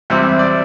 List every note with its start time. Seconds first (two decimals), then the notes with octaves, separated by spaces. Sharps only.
0.10 E2 C3 G3 C4 E5
0.39 D5